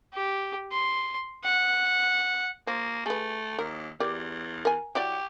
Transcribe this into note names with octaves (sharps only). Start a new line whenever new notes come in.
G4
C6
F#5
F3 A#3
A3 G#4 B4
D#2 A#4
E2 G4 A#4 D5
A#4 G#5
F#3 E4 G4 D5